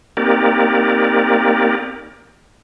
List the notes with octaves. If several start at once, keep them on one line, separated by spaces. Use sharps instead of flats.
A#3 C4 D#4 G4 A#4 D5